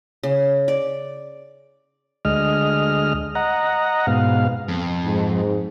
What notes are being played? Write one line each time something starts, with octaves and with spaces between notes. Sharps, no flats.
C#3
D5
D2 G#3 D#5 F6
D#5 F#5 A#5
G#2 B2 F5
F2
G#2